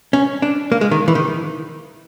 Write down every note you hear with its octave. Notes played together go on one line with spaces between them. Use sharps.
C#4
D4
A#3
G#3
D#3
E3
D#3